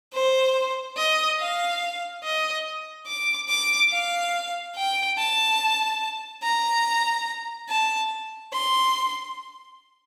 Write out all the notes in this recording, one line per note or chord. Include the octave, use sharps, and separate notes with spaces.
C5
D#5
F5
D#5
D6
D6
F5
G5
A5
A#5
A5
C6